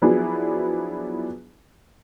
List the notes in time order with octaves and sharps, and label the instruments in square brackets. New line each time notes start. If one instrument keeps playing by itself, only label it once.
[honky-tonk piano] F3 F#3 B3 D4 E4 G#4